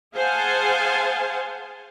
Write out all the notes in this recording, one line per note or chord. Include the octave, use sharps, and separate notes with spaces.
G#4 C5 F5 F#5 G#5 A5